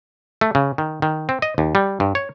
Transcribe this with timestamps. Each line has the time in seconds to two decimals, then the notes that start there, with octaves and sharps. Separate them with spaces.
0.41 A3
0.55 C#3
0.78 D#3
1.02 D#3
1.29 C4
1.42 D#5
1.58 D#2
1.75 G3
2.00 G2
2.15 C#5